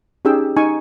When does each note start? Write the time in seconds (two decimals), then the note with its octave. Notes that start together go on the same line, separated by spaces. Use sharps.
0.25 C#4 D#4 G4 G#4 G5 E6
0.56 D#4 G#5 C#6